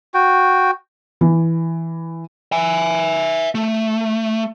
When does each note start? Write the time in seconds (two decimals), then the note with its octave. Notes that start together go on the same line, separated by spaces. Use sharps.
0.14 F#4 G5
1.21 E3
2.52 E5 G#5
3.55 A3